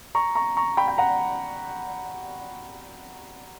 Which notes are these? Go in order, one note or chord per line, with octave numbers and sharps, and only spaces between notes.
A#5 C#6
A#5 C#6
A#5 C#6
G5 B5
G5
F#5 A#5